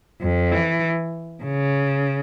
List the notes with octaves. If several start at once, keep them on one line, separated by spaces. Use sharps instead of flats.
F2
E3
C#3